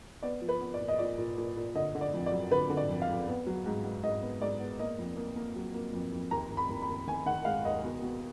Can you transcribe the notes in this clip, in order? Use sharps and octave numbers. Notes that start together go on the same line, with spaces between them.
B3 D5
F3
B4
B3
D5
A#2
D#5
A#2 D5
A#2
A#2
A#2
D3 D#5
D3
D5
F2
D5
F#3
D3 B4
D3
D5
F2
F5
F2
B3
F#3
G#2
G#2
G#2 D#5
B3
G#2 D5
B3
A#3 D#5
F2
A#3
A#3
F#3
A#3
F2
F2
D#2 A#5
D#2
B5
D#2
B5
D#2
D#3 G#5
D#3 F#5
G#3 F5
D#2 D#5
B2
B2